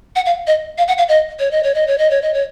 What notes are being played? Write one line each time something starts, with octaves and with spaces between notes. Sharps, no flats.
F#5
F5
D#5
F5
F#5
F5
D#5
C#5
D#5
C#5
D#5
C#5
D#5
C#5
D#5
C#5